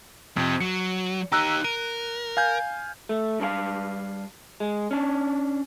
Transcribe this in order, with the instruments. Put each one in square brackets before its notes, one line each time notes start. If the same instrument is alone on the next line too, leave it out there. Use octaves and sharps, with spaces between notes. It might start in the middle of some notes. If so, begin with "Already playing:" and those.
[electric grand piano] F2 [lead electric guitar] C3 C4
[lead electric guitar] F#3 [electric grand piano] C#7
[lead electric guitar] D#4 G4 [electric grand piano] A#5 E6 F#6
[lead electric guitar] A#4 [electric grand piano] D#7
[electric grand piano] F5 G#5 G6
[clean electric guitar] A3
G2 D4 G4 F5
G#3
C#4 D4